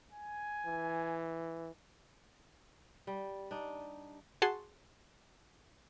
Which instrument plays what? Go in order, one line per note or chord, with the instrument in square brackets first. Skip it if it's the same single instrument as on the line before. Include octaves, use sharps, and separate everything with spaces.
[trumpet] G#5
[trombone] E3
[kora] G3
D4 D#4
[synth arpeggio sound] F#4 G#4 F#5 A5 C6